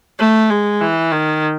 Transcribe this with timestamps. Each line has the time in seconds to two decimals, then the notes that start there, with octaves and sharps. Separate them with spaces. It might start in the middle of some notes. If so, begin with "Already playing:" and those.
0.19 A3
0.50 G#3
0.81 E3
1.12 D#3